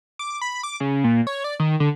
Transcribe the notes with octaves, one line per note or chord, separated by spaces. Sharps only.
D6
B5
D6
C#3
A#2
C#5
D5
D#3
D3